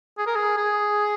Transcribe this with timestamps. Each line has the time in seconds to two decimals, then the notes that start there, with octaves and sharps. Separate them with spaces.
0.18 G#4
0.27 A#4
0.35 G#4
0.57 G#4